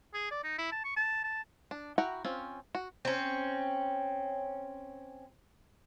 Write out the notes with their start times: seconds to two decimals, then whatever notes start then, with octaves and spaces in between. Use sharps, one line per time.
0.14 G#4
0.31 D5
0.44 D#4
0.58 E4
0.72 A5
0.84 C#6
0.96 A5
1.24 A5
1.71 D4
1.98 E4 F#4 F#5 G5 A#5
2.25 C4 C#4 F4
2.75 F#4
3.05 C4 C#4